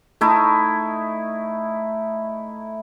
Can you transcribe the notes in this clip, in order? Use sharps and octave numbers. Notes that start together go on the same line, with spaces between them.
A3 D#4 E4